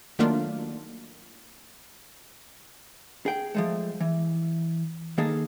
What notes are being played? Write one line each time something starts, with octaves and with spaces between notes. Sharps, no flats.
D#3 F#3 A3 A#3 D4 F4
G#4 G5
F3 G#3 A3
E3
D#3 A#3 D#4 G#4 A4